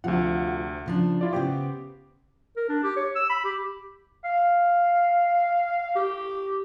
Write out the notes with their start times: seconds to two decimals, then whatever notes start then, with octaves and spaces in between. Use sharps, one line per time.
0.04 D2 C3 F3 F4 F#5
0.86 C#3 F3 D4
1.21 E4 F4 D5
1.33 C#3 B3 G4 C5 D6
2.57 A#4
2.69 D4
2.83 G4
2.96 C#5
3.16 E6
3.30 B5
3.44 G4
4.24 F5
5.96 G4